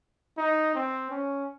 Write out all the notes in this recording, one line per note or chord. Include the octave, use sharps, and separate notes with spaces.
D#4
C4
C#4